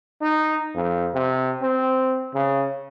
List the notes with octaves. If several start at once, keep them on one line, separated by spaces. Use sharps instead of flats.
D#4
F2
C3
C4
C#3